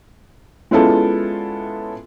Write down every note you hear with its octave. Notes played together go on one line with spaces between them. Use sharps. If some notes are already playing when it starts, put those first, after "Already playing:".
G#3 B3 C#4 E4 F4 A4